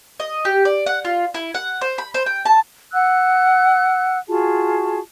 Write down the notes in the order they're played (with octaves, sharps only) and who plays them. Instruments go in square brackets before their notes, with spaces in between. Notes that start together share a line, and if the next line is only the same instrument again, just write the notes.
[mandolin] D#5
G4
D5
F#5
F4
E4
F#5
C5
B5
C5
G5
A5
[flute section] F#5 E6 F#6
F4 F#4 G#4 A5